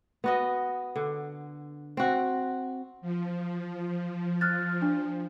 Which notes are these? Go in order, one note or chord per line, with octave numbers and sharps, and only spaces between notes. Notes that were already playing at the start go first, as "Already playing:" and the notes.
B3 F#4 D#5
D3
C4 F#4
F3
F6 F#6 A6
D4